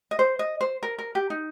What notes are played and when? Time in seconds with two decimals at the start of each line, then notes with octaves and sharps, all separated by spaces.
0.11 D#5
0.19 C5
0.39 D#5
0.61 C5
0.83 A#4
0.99 A#4
1.15 G4
1.30 D#4